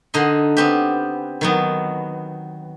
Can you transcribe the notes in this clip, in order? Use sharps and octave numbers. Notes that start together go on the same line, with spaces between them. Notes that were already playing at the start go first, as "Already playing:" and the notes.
D3 D#4 D#5 C6
B3 C4 G4
D#3 F#3 B3